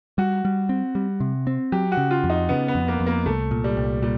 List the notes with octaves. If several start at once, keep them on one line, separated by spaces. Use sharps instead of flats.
G3 F#4
G3
C4
G3
C3
C4
F#3 G4
F#4
C#3
F4
F2
D#4
C#3 B3
B3
F2
A#3
F2
A#3
C2 A3
A#2
G3
C2
A#2 G3